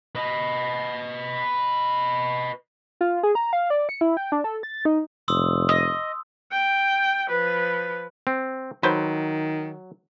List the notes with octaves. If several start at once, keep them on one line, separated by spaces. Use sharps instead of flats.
B4 D#5
F4
G#4
A#5
F5
D5
C#7
E4
G5
D4
A4
A6
D#4
F1 C6 D#6 E6
D#5
G5
F3 B4
C4
D#3 F#3 B4 C5